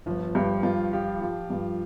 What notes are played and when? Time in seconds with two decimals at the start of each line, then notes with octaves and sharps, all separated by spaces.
0.06 G1 F3
0.35 G2 G4
0.63 G2 F4
0.93 F3 G4
1.21 F3
1.50 G2